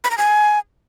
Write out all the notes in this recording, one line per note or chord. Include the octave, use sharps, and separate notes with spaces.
B5
A#5
G#5